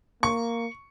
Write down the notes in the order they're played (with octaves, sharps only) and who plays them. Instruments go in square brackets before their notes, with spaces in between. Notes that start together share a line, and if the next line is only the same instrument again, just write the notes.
[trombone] A#3 [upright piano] C#6